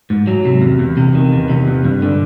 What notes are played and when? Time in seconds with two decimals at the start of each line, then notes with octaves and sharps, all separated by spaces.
0.10 G#2
0.27 F#3
0.45 C3
0.62 E2
0.79 E2
0.97 C3
1.15 D#3
1.33 E2
1.50 C3
1.67 E2
1.85 G2
2.02 D3